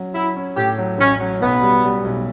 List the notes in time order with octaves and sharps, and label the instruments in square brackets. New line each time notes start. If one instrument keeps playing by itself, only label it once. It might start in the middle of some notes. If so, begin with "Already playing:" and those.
Already playing: [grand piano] F#3 C#4
[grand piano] F#3 [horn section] E4
[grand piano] C#4
[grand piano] A2 [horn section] G4
[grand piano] F#3
[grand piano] A1 [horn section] C#4
[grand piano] F#3
[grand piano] B1 [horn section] B3
[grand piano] G3
G3
B1